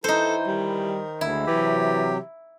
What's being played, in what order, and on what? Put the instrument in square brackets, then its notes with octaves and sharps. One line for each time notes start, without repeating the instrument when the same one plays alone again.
[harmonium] E3 E4 [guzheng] D#4 C5 [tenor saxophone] A4
[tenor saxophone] D#3 [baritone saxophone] G3
[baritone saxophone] D2 [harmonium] G#3 [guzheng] E4
[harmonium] C3 F#3 [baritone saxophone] E3 [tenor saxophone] G4